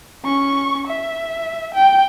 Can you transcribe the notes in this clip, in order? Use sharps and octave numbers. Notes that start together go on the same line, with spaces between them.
C#4 C#6
E5
G5